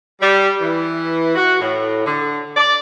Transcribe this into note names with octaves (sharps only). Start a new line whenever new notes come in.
G3
E3
F#4
A2
D3
D5